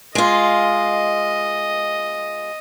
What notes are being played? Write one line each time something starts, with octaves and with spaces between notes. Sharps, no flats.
G#3 F4 D#5